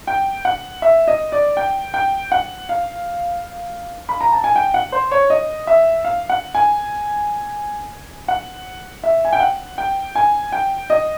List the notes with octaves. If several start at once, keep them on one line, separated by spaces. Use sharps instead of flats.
G5
F#5
E5
D#5
D5
G5
G5
F#5
F5
B5
A#5
A5
G#5
G5
F#5
C5
C#5
D#5
E5
F5
F#5
G#5
F#5
E5
G#5
G5
F#5
G5
G#5
G5
D#5